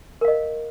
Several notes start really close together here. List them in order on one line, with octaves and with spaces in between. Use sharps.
A#4 F5 D#5